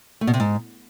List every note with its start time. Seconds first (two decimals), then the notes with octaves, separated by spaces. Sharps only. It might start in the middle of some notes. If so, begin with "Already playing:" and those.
0.21 A3
0.27 B2
0.34 C3
0.40 G#2